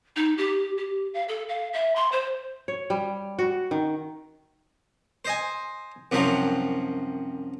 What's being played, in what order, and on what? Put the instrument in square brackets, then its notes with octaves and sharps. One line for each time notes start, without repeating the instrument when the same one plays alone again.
[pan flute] D#4
G4
G4
F5
A4
F5
E5
C6
C5
[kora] C#5
G3
F#4
D#3
[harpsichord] C5 D#5 G#5
C2 F#2 C3 F3 F#3